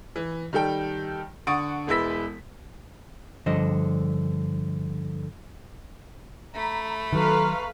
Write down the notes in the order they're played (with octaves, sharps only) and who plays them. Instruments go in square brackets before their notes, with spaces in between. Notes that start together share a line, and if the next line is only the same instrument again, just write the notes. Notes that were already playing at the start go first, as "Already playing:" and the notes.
[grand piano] E3
D#3 G3 A4 G5
D3 F#5 C#6 D#6 A6 D7
E1 G#3 E4 B4 E6 B6
[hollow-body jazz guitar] G2 D3 F3 C5 D#5
[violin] A3 B5 [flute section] A#5
[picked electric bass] D#3 F#3 [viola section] A4 B4 F5 [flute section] A#5 C6 C#6